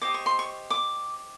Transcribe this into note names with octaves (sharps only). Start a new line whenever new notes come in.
G4 C5 D#5 D6
C#6
C6
C#6
D6